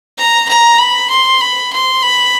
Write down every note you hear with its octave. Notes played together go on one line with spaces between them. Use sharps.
A#5
A#5
B5
C6
B5
C6
B5